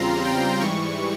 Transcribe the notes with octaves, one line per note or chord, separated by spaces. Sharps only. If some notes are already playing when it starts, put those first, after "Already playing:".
Already playing: E2 C#3 G3 C4 F4 A#5 C6
G5
G#2 E3 G3 C#6